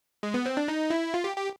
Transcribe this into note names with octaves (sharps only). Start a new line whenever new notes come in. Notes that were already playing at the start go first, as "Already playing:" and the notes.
G#3
B3
C4
D4
D#4
E4
F4
G4
G4